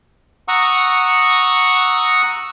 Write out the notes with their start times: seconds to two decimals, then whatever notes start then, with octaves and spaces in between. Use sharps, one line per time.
0.48 F#5 A#5 C#6 D#6 E6